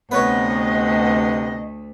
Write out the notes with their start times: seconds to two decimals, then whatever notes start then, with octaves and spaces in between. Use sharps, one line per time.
0.11 D2 C3 B3 B4 C#5 D#5 C#6